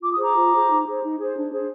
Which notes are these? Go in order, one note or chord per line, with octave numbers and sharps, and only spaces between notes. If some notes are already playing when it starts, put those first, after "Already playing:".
F4 D6
D#6
G#4 C5 A#5 D6
F4
G#4 C5
D#4
G#4 C5
D#4
G#4 C5
D4
G#4 C5